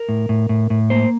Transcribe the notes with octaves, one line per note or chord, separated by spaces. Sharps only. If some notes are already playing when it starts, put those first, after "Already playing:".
Already playing: A#4
A2
A2
A2
A2
A#3 C5